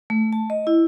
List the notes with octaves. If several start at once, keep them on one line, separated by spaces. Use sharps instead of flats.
A3
A5
D#5
E4